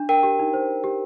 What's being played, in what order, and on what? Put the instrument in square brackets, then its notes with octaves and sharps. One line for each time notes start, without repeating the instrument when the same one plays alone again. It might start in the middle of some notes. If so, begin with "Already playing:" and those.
Already playing: [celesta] D4
[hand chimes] A#4 [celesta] G5
[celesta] G4
D#4
C5
G4
G4